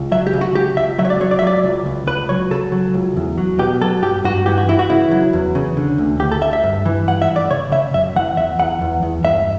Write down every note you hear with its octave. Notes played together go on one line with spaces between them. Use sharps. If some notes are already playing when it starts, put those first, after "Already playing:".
Already playing: C#2
F#3 E5
G4
C#3
F#4
C#3 G4
C#2 E5
F#3 E5
C#5
D5
F#3 C#5
D5
E5
F#3 D5
C#2
C#2
C#2 B4
F#3 C#5
C#3 A4
F#3
C#2
E2
F#3
B2 G4
F#3 A4
G2 G4
G2 F#4
E3 G4
F#4
E3 E4
F#4
C#3 E4
F#3
E2
C#3
D3
D2
D2 G4
A4
D2 E5
E5
G2
E3
G2 F#5
E5
G2
D5
C#3 C#5
C#3 E5
F#2 E5
E3 F#5
E2 E5
E2 F#5
E2
E2
G2 E5